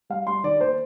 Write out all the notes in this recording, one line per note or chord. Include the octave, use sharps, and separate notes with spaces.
G3 F5
G3 C6
D#3 D5
A#3 C5